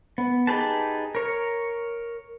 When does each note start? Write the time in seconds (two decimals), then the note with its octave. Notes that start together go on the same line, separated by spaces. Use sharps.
0.18 B3
0.47 D#4 G4 G#4 B4 A5
1.15 A#4 C#5